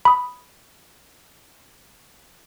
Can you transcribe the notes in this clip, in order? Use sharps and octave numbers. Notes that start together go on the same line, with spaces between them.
B5 D#6